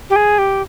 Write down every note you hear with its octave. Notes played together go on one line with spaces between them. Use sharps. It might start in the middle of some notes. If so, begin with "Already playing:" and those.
G4
G#4
G4